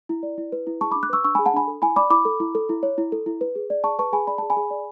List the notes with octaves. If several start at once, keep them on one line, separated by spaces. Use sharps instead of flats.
E4
D5
E4
B4
E4
G#4 A5 C#6
D4 B5 D6
D6 F#6
B4 C#6 E6
D4 C#6 E6
G#4 G#5 B5
F#5 A5
D4 G#5 B5
A4
E4 G#5 B5
D5 B5 D6
E4 B5 D6
A4
E4
A4
E4
C#5
E4
A4
E4
B4
G#4
D5
G#4 A5 C#6
B4 A5 C#6
G#4 G#5 B5
D5 B5
G#4 A5
G#5 B5
G#4
D5